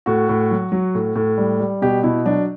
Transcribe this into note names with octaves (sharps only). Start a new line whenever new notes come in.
A2 F#4
A2
F#3
F#3
A2
A2
G3
G3
B2 G4
B2 E4
F#3 D4